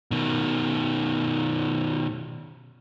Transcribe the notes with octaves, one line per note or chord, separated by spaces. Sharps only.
B2 D#3